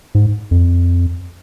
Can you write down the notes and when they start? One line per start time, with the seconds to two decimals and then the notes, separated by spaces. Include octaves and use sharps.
0.15 G#2
0.51 F2